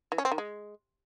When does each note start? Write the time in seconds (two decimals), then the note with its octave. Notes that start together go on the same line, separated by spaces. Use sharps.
0.12 E3
0.18 C#4
0.25 C4
0.32 D#3
0.38 G#3